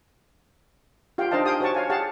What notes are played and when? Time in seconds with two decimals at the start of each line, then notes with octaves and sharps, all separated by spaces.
1.18 F4 G4 F5 G5
1.31 D4 D#4 C5 D#5 F5 A5
1.45 G4 F5 G5 G#5 D#6
1.60 F#4 G4 C5 C#5 A5 C#6
1.74 C#5 F5 G#5
1.89 G4 G#4 F5 F#5 A5